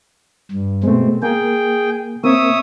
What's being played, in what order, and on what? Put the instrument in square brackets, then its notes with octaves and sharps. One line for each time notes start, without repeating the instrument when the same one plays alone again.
[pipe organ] G2
[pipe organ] B2 C4 [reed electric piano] G#3 A3
[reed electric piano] A#3 [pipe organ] G#4 G5
[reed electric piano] A#3 C4 [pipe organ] C#5 E5 D#6